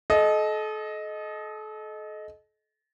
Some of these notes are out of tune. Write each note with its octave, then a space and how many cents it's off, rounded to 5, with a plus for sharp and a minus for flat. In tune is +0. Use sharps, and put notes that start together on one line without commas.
A4 -35 D#5 +0